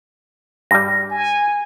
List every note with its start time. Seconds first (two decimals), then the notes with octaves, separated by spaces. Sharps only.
0.71 G2 G3 A#6
1.11 G#5